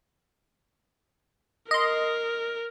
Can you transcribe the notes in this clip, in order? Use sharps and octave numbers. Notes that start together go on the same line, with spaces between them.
A#4 D#5 C6